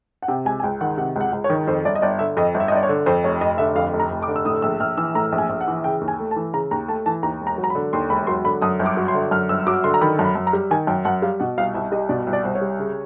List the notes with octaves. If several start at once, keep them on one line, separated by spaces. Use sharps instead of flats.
F#5
C3 G5
C#2 G#5
G#5
C#2 G5
D#3 F#5
C3 F#5
C#2 F#5
C#2
C#5
D#3
F2 C5
G1 D5
D#5
G1 D5
D3 E5
F2 D#5
G1
E5
D#5
G1 D5
C#5
D3
F2 C5
F1 C#5
F1 D#5
D3 E5
F2 F5
F1
A#5
F1
D6
D3
E6
A2 D#6
A#1 E6
A#1 F6
E3 E6
A2 A#5
A#1
G#5
A#1
F#5
E3
C#3 G5
D#2
G#5
A3
A5
E3
C#3 A#5
D#2 A#5
A3 A5
E3 A5
D#2 A#5
E1
A#5
F#3
A#5
B5
D3
D#2 C6
E1 B5
F#3 C6
D3 B5
F#2 D#6
G1
D6
F#3
C6
D3
F#2 F6
G1 E6
F#3 D6
D3 C6
A#5
D#3 B5
F#2
B5
F#2
A#5
G3
D#3 G#5
F#2 G5
F#2 F#5
G3 F5
B2 F#5
C2 F5
C2 E5
G3 D#5
B2 D5
C2
D5
C2 C5
C#5
G3
C#3